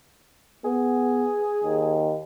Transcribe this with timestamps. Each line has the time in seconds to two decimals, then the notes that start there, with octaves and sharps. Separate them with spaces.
0.65 B3 G#4
1.63 D#2